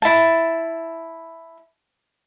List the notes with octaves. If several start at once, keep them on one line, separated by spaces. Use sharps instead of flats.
E4 A5